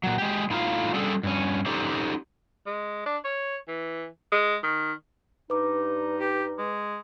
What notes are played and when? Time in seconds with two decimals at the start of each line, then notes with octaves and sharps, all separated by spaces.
0.03 A#2 F#3
0.18 G#3 G4
0.50 A2 D#4 F4 F5
0.94 G3 C#4 D4 G#4 A4
1.23 G2 C#4
1.66 C#4 D#4 G4 A4 C5 D5
2.66 G#3
3.06 D4
3.25 C#5
3.68 E3
4.32 G#3
4.63 D#3
5.50 G2 D#4 B4 D6
6.20 G4
6.59 G#3